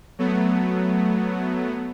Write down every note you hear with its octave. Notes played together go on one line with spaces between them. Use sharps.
F#3 A3 B3